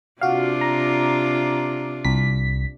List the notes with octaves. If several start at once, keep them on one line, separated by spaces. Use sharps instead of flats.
C3 D4 F4 F#4 F5
A#5
C2 B6